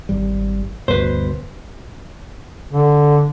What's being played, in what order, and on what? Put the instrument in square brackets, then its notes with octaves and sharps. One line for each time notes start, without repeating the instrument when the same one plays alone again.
[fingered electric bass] G#1 G3
[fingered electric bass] D2 G2 B2 [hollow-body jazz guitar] B4 C5
[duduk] D3